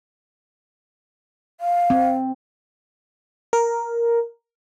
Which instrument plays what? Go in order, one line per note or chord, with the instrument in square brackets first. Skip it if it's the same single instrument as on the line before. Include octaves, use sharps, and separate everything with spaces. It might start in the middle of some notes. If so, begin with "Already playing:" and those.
[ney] F5
[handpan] C4
[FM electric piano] A#4